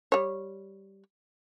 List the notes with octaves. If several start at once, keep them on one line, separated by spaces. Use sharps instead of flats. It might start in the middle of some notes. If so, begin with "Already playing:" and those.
G3 C#5